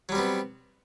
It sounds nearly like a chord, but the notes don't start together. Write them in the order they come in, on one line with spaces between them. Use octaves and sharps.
F#3 G3 C4 B3